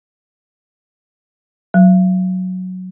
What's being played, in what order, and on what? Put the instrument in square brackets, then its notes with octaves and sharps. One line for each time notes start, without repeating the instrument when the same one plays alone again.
[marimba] F#3